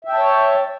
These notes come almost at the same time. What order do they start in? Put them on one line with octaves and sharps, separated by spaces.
E5 G5 A5 C#5